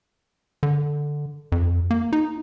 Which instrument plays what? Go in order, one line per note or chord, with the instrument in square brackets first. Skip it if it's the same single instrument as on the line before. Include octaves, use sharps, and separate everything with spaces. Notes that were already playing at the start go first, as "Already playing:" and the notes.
[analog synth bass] D3
F2
A#3
D#4